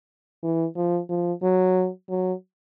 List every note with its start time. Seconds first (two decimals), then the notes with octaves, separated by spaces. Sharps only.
0.43 E3
0.76 F3
1.09 F3
1.43 F#3
2.09 F#3